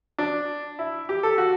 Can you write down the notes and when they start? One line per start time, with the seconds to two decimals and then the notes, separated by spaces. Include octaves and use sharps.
0.18 D4
0.79 E4
1.09 G4
1.23 A4
1.38 F#4